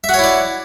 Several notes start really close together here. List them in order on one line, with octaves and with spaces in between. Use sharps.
E5 F#4 C#5 E4 D5